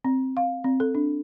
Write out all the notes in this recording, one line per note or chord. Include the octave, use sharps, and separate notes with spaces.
C4
F5
C4
A4
D4